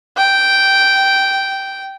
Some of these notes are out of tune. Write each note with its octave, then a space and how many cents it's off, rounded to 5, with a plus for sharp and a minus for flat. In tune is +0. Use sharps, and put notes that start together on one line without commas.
G5 -10